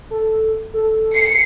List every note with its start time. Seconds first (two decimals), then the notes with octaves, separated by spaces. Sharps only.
0.10 A4
0.74 A4
1.15 C7 C#7